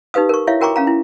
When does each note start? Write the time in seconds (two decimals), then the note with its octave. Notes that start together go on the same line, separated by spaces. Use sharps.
0.14 D#4 G4 B4 F5 D#6
0.29 A#4 C#6
0.47 E4 C#5 E5 F5
0.61 F#4 A#4 G5 A#5 C#6 D6
0.76 C#4 F5 A#5
0.87 E4